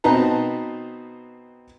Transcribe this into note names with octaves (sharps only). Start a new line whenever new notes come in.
B2 C4 D#4 B4 A5 A#5